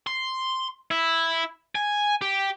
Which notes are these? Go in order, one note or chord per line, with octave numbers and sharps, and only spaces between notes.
C6
E4
G#5
G4